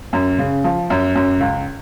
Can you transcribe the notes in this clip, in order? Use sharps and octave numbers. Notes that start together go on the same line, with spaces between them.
F#2
C#3
F3
F#2
F#2
C#2